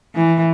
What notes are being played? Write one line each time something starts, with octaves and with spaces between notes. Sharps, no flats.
E3